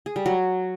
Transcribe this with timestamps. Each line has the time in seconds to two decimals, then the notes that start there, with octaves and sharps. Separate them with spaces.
0.06 G#4
0.16 G3
0.26 F#3